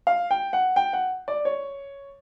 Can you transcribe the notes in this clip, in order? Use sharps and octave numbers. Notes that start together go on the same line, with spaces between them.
F5
G5
F#5
G5
F#5
D5
C#5